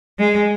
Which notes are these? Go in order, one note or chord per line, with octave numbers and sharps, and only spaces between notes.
G#3